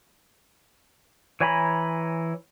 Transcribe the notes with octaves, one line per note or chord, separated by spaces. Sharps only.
E3 C#5 G#5 A#5 B5